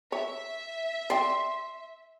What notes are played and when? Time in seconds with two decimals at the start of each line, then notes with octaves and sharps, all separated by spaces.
0.12 C#5 E5
1.10 D5 G5 C6